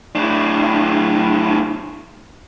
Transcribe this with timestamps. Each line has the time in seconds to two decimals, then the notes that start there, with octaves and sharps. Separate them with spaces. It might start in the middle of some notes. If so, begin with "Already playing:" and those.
0.15 A2 D4